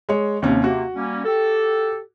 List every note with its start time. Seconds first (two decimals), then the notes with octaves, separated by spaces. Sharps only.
0.09 G#3 C#5
0.42 D#2 C3 C#4
0.64 C3 A#3 F#4
0.96 G3 A#3 C#4
1.25 G4 A4